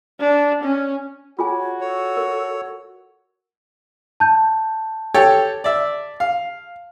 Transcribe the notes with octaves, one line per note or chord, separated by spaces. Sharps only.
D4
C#4
F4 F#4 G#4 C#5 G#5
A4 C#5
A#4
A5 G6
G4 A4 C#5
D5 E5
F5